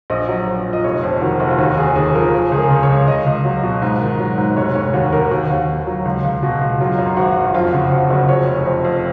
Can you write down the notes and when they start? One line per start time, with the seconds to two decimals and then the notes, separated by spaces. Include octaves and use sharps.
0.10 A#1 D#5
0.29 F#3
0.47 A#1
0.66 A#2
0.73 D#5
0.84 F1 C#5
1.03 F2
1.21 D#3 F#4
1.40 F1
1.50 F4
1.58 D#2 F#4
1.77 D#2 G#4
1.96 D#2 G#4
2.14 F3 A#4
2.33 F3 G#4
2.52 C#2 G#4
2.58 A#4
2.71 C#3
2.83 C#5
2.89 C#2
3.07 C#2 D#5
3.26 C#2
3.45 F#3
3.63 B2
3.82 G#2
4.01 D#3
4.19 F#3
4.38 G#2
4.57 F1 C#5
4.75 F1 C#5
4.94 D#2 F#4
5.12 D#2 A#4
5.31 D#2 F#4
5.50 D#2
5.68 D#2
5.87 F#3
6.05 C#2
6.24 C#2
6.43 B2
6.61 C#2
6.81 F#3 F4
6.98 F#2
7.17 G#1 F#4
7.36 F#2
7.54 F2 F4
7.73 C#3 F#4
7.91 F2 F#4
8.10 F#1 F#4
8.29 F2 C#5
8.48 F1
8.66 F2
8.85 F2